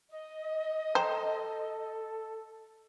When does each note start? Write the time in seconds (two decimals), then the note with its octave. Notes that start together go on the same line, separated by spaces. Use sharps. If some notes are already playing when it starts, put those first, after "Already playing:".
0.10 D#5
0.95 A4 C5 G5 A#5